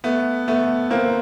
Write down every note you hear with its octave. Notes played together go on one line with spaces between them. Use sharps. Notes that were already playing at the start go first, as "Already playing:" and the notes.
A3 B3
A3 B3
A#3 C4